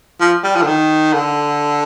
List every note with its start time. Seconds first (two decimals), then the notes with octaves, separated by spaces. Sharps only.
0.20 F3
0.44 G3
0.56 F3
0.62 D3
0.67 D#3
1.13 D3